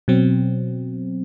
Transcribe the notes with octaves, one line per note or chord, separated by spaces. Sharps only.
B2 F#3 C4